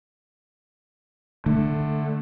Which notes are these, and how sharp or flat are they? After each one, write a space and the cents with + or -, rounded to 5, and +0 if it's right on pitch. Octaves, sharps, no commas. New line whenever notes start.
D3 +20 A3 +0